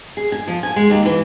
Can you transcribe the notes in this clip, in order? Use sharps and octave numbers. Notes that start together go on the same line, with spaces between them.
G#4
G#5
F3
G#5
G#3
D#2
E3